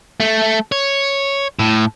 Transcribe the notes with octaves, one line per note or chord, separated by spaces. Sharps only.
A3
C#5
A2